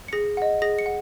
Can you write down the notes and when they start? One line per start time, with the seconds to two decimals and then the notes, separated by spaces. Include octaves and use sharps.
0.08 C#7
0.13 G#4 A#6
0.37 D#5 F#5
0.62 G#4 A#6
0.79 C#7
0.86 F#5